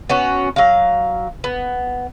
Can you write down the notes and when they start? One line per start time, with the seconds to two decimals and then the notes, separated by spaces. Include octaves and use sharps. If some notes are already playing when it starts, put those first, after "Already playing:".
0.09 B3 C#4 F#4
0.56 F#3 F5
1.44 B3